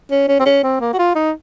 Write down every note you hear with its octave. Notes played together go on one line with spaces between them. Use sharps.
C#4
C#4
C4
C#4
C4
A#3
F#4
F4
D#4